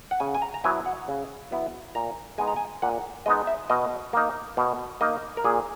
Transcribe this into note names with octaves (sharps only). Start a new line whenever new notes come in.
F#5
C#3 G#5
G#5
A#5
A#5
F#3 B3 E4 G#5
F#5
C#3
F#3 B3 E4
A#2 A#5
G#3 B3 D#4 G#5
A#5
G#5
A#2 F#5
G#3 B3 D#4 D#5
E5
B2 D#5
A#3 D#4
B2
A#3 D#4 D#5
A#4
A#2 G#4